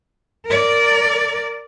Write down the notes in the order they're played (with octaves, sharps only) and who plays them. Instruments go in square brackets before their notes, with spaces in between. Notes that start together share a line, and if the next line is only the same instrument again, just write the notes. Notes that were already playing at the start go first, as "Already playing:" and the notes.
[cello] A#4 D5